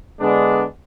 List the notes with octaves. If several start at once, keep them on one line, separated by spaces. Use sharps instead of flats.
D3 G#3 B3 D4